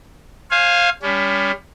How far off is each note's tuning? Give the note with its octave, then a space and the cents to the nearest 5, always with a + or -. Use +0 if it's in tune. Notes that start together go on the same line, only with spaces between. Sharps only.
C5 +35 F5 +0 G#5 +0
G3 +30 C#4 +40